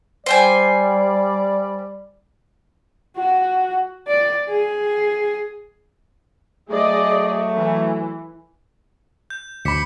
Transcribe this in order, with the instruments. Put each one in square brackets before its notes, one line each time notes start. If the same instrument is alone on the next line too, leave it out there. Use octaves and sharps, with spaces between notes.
[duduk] G3 [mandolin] C5 G5 G#5 [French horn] D5
[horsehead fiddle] F#4
D5
G#4
[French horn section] F#3 A3 [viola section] G#4 D5 D#5
[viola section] E3
[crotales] G6
[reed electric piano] D2 B5 [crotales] D6 B6 C#7